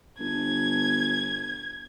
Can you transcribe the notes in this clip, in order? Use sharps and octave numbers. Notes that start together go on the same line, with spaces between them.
G1 G#6